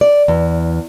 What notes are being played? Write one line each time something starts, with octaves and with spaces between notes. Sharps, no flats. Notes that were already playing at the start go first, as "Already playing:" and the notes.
D5
E2